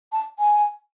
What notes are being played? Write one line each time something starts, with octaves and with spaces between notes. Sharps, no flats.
A5
G#5